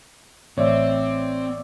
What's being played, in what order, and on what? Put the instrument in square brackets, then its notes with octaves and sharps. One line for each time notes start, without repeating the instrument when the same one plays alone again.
[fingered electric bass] A1 [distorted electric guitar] C4 [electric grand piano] C#5 D5 E5